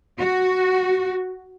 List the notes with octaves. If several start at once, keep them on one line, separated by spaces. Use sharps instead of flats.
F#4